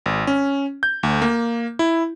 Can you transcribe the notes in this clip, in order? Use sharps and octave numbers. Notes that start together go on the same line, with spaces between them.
G#1
C#4
G6
D2
A#3
E4